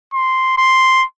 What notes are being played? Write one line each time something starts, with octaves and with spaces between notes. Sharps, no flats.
C6
C6